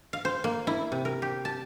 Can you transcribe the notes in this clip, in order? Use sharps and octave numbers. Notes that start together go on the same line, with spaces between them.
F5
C5
A#3
E4
C3
A#4
G4
A5